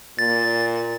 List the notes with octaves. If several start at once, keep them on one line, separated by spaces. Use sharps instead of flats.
A#2 A6